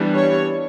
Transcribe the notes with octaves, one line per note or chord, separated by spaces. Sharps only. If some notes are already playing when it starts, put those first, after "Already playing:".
Already playing: E3 G3 B3 D4
C#5